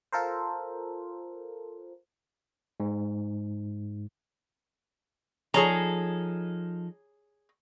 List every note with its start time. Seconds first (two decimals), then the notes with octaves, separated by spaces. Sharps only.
0.12 F4 A4 A#4 C5
2.80 G#2
5.54 F3 D#4 G#4 A4 C#5 A#5